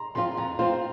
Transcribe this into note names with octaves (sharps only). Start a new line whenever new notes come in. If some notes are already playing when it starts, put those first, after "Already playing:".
Already playing: A#5 C6
F3 C4 F4 C6
F2 A#5
F3 C4 F4 C5